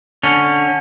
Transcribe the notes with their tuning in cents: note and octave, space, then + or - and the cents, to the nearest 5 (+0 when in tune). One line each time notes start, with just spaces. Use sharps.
D3 +0 C#4 +0